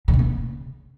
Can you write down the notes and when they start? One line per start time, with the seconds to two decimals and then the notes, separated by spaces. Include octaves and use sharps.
0.08 D3
0.13 D#3
0.19 B2
0.24 C#3